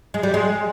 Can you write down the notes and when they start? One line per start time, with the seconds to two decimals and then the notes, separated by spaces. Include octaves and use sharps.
0.14 G#3
0.23 G3
0.34 G#3